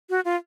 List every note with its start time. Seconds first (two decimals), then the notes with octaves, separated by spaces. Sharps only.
0.10 F#4
0.25 F4